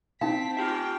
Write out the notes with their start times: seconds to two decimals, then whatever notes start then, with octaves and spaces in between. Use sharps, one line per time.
0.21 C4 C#4 D#4 F5 A5 B6
0.57 F4 G4 E5 G5